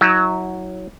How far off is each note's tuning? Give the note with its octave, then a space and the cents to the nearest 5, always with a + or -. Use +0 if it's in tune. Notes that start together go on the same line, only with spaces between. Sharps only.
F#3 +0 E4 -35